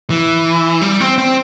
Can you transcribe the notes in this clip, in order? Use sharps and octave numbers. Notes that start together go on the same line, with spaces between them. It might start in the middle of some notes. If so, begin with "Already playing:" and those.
E3
G3
C4
C4